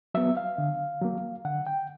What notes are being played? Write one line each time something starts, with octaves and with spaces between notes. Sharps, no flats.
F#3 B3 E5
F5
D3
F#3 A#3
D3 F#5
G5